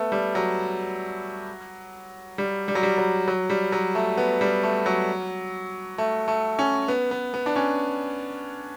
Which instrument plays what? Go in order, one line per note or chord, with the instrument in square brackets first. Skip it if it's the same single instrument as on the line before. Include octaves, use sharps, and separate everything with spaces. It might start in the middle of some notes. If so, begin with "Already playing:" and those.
Already playing: [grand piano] A3 B3
G3
F#3
G3
G3
F#3
G3
F#3
F#3
G3
F#3
A3
B3
G3
A3
F#3
A3
A3
C#4
B3
B3
B3
D4
C#4